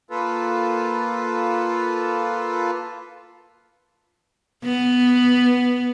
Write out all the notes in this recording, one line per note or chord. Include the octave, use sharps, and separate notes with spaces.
A#3 F4 A4 B4
B3